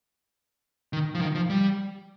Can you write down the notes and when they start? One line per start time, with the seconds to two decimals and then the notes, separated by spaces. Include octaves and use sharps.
0.93 D#3
1.15 F3
1.21 D#3
1.35 F3
1.50 G3